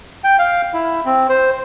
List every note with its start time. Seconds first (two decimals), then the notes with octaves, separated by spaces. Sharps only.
0.24 G5
0.39 F5
0.74 E4
1.05 C4
1.29 C5